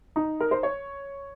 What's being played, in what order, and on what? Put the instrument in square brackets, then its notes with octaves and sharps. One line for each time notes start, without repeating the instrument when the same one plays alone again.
[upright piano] D#4
A#4
C5
C#5